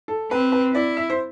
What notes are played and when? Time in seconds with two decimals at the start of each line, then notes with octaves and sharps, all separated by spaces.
0.08 A4
0.31 C4 B4
0.52 B4
0.74 E4 D5
0.97 E5
1.10 C5